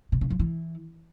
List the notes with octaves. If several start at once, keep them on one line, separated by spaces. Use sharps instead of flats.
B2
C#3
F3
E3